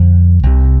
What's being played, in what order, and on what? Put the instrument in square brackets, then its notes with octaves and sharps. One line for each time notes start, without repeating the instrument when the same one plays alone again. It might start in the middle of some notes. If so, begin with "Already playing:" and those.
Already playing: [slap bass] F2 D3
C2 C3